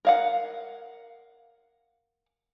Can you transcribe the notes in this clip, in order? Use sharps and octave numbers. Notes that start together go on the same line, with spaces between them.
A#4 F5 F#5